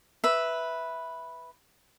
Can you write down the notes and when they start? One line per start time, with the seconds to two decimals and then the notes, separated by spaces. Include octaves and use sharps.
0.24 B4 E5